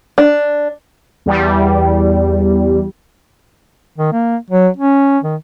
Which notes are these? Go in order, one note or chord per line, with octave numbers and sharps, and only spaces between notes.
D4
E2 G3
D#3
A#3
F#3
C#4
D#3